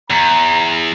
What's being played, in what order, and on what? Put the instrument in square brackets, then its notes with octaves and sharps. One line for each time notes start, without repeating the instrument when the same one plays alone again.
[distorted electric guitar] E2 [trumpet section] A#5